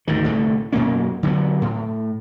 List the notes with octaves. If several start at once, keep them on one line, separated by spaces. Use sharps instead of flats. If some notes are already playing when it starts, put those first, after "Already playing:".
D2 G#2 D#3
C2 A2 D3 A3
F#2 B2 A#3 C#4
D3 F#3 A#3 B3
A2